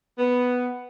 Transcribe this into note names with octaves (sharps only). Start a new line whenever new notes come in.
B3